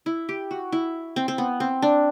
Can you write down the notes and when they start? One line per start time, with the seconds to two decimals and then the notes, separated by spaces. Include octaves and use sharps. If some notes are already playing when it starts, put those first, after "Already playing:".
0.06 E4
0.29 G4
0.51 F#4
0.72 E4
1.16 C4
1.28 C4
1.38 B3
1.60 C4
1.82 D4